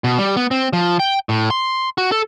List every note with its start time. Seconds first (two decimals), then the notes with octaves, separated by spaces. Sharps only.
0.04 B2
0.19 G3
0.37 B3
0.51 C4
0.73 F3
0.99 G5
1.29 A2
1.50 C6
1.98 F#4
2.12 A4